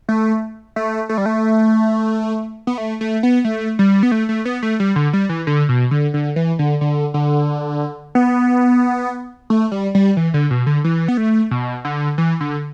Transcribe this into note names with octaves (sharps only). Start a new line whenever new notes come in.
A3
A3
A3
G3
A3
B3
A3
A3
B3
A3
G3
B3
A3
A3
B3
A3
G3
D3
G3
E3
D3
B2
D3
D3
E3
D3
D3
D3
B3
A3
G3
G3
E3
D3
B2
D3
E3
B3
A3
B2
D3
E3
D3